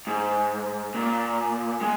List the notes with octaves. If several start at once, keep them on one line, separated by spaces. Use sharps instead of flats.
G#2
A#2
G#3